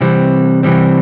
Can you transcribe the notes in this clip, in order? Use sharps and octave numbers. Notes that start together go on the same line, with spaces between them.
C3 E3 G3 C4
C3 E3 G3 C4